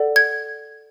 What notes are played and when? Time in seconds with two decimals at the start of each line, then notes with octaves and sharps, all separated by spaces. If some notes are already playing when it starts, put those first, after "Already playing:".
Already playing: A4 D5 F#5
0.16 G#6